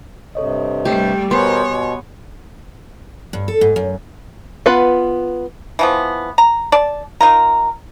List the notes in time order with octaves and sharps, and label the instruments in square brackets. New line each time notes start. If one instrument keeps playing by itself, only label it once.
[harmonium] G2 C3 [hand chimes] A4 C#5 D#5
[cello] G3 A3 [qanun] G4
[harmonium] B2 A#4 C5 [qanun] B3 [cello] C#5 [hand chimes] G#5 C6
[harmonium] B2
[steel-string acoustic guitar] G2
A4
G#2
F#2
[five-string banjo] B3 F4 B4 F#5
[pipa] E3 F3 B3
A#5
D5 A5
D#4 F4 A#4